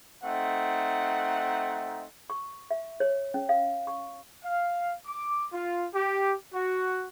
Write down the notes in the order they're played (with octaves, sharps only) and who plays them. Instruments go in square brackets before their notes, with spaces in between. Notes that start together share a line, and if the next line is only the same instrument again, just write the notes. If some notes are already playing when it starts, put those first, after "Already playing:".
[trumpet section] A3 C4 D#4 F#5
[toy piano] C#6
E5
C#5
C#4
F5
C#6
[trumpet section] F5
D6
F4
G4
F#4